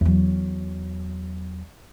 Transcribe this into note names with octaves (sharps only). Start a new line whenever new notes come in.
E2 F#3